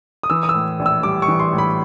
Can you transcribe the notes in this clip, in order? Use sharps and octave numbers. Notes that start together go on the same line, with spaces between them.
D#6
E3 E6
D#6
E6
A2
A#1
E6
G3 D6
C#6
E3
C6
A2
B5